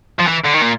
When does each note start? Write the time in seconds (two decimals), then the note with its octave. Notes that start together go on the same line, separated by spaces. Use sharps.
0.20 F3
0.28 E3
0.45 D3
0.54 D#3
0.62 A#2